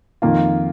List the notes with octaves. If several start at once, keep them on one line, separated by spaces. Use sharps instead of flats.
F2 D#3 A#3 F4